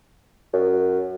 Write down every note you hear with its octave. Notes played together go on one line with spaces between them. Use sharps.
F#2